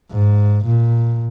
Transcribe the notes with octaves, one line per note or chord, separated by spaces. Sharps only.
G#2
A#2